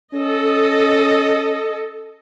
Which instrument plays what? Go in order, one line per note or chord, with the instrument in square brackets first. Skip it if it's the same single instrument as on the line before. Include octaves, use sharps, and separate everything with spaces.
[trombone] C#4 [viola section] A4 D#5